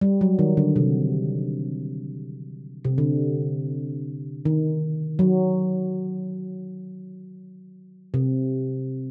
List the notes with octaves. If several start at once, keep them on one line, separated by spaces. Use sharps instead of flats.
G3
F#3
D#3
D3
C3
C3
D3
D#3
F#3
C3